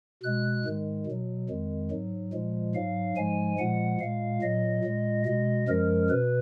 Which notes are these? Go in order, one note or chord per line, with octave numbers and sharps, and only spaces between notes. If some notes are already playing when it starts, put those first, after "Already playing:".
B2 G#3 F#6
G#2 D#3 G#3
B2 F#3
F2 D#3 G#3
G#2 F#3
A#2 F3 G#3
G#2 F#3 F5
G#2 F3 G#3 G#5
A#2 F3 G#3 F#5
A#2 G#3 F5
A#2 F#3 D#5
A#2 G#3
B2 G#3 D#5
F#2 F3 G#3 A#4
B2 B4